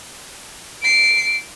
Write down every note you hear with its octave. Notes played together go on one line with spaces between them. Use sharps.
C7 D7